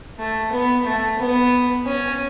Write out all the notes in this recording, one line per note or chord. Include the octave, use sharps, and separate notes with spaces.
A3
B3
A3
B3
C#4